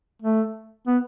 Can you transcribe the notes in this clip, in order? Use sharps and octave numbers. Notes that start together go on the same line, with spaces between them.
A3
B3